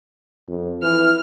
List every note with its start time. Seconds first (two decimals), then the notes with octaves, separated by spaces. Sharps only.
0.48 F2
0.83 E3 F6